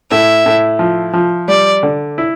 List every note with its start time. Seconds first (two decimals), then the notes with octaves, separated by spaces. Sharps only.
0.11 A2 E5
0.46 A2
0.79 F3
1.13 F3
1.48 G3 D5
1.83 D3
2.18 E4